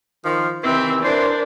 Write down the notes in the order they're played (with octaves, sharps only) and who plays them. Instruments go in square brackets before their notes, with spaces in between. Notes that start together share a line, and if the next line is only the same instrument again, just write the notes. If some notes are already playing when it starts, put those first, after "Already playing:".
[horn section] D#3 F3
[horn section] C3 D#3 E3 [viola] C4 E5
[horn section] E3 C5 [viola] D4 A#4